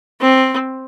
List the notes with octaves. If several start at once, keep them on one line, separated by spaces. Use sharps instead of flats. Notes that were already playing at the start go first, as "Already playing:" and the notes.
C4